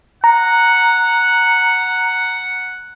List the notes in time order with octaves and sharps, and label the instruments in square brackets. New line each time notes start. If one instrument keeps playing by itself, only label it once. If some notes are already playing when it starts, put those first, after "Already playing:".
[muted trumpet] F#5 [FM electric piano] A#5